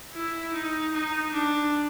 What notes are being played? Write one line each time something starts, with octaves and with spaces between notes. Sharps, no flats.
E4
D#4
D#4
D4